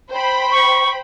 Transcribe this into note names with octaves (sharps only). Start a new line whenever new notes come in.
C5 G5 B5
C#6